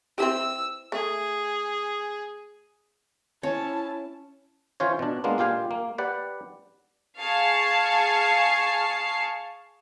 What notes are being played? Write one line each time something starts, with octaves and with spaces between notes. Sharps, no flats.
C4 E4 G4 E6
A3 G#4
C#4 E4 C#5 A5
E3 C#4 F4 C5 C#5
B2 D4
G#3 A#3 B3 D4 F4
A#2 F4 G4 F5 G#5
A#3
G4 B4 D5 F#5
G#4 F5 A5 C#6 C7